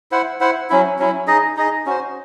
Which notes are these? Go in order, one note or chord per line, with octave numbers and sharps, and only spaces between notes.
E4 C5 F#5
E4 C5 F#5
F#3 C#4 E4
F#3 C#4 E4
D#4 G#4 D#5
D#4 G#4 D#5
C#4 F#4 C5